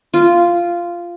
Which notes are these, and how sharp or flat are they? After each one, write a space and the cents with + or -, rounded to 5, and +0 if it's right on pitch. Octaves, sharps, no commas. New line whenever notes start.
F4 -10